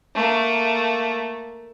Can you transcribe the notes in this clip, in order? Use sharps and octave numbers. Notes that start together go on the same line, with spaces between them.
A3 A#3